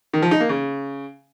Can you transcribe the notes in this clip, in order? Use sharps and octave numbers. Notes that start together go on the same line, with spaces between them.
D#3
F3
D#4
A#3
C#3